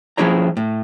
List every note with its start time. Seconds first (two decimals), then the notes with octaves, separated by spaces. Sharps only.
0.17 F3 C#4 E4 G#4 C#5 A#5
0.57 A2